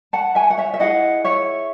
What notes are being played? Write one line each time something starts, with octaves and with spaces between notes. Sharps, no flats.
F#5 A5
E5 G#5
F#5
C#5 E5
E5
E4 G#4 D#5 F#5
C#5 E5